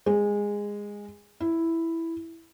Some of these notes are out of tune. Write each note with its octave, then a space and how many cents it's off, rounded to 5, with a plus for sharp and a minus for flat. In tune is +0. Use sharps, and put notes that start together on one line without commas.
G#3 -15
E4 +0